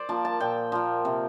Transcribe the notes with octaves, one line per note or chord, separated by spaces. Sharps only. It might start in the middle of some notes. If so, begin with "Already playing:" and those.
Already playing: C5 D5
F3 A#3 A5
A5
A#2 G5
F3 A#3
C3